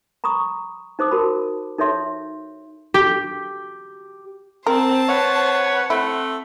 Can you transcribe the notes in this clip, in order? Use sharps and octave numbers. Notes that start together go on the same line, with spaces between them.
A#5 B5 C#6 D#6
D#4 C5 D6 D#6
F#4 A#4 A5 B5
D#4 A4 C#5 E5 C6
G4
C4 A#4 C5 A5
B4 C#5 F#5
A3 C4 E4